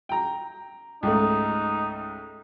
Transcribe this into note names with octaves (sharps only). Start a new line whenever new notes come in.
G5 A#5
C#2 G#2 A3 D#4